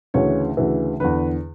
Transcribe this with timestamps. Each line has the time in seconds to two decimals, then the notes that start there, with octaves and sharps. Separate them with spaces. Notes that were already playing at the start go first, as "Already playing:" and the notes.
0.14 D2 C#3 E3 C#5
0.57 D2 C#3 E3
1.00 E2 D3 B4